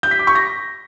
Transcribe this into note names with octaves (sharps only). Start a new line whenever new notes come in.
G6
B6
D6
C#6
A#6